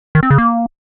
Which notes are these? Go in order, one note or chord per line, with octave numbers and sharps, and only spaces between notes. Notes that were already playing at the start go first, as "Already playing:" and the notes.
D#3
C4
C#3
A#3